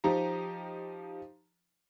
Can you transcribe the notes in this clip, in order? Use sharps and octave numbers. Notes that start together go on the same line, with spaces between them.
F3 D#4 G4 A#5